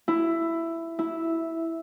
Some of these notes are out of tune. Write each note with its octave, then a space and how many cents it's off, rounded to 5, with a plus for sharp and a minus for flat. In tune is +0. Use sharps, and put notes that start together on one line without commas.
E4 +10
E4 -5